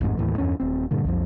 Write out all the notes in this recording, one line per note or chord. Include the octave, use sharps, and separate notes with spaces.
A1 F2 G#2
D#2 A2 E3
E2 G2 C#4
D#1 C4
G2 A#2 D3
B1 F2 F3